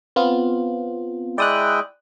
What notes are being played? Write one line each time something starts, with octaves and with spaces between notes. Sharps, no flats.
B3 C4 F4
G#3 E4 D5 G5 D#6 F#6